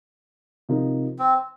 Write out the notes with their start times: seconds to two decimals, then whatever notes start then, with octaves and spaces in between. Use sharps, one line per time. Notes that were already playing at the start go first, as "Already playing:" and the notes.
0.69 C3 F3 D#4 A#4
1.19 C4